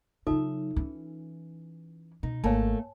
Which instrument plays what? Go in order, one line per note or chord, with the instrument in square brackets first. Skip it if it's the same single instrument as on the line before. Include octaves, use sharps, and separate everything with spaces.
[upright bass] C#3 F#3 [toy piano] D#4 F4 A4 [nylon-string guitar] E5
[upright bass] E3 C#4
[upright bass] B2 [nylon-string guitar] D#4
[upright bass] G#1 [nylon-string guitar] A3 A#3 [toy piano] C#5 G#5 A5